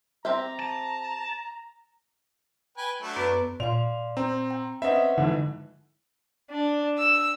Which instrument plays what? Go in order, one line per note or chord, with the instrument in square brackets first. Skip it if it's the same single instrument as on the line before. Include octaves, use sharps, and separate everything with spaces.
[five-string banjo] C4 G4 E5 [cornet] A#5
[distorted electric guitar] A5
[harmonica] B4 G5 G#5
F#3 A3 D4
[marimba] F#2 B3 B4
[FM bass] A#2 [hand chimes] D5 F5 C6 [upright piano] F7
[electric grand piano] C4 [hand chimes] A#5
[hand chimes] G5
[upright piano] C4 C#4 D#5 [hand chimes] B4 F#5 B5 [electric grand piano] E5
[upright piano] F2 G#2 E3 [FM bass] D3 [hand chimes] D#4
[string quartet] D4
E6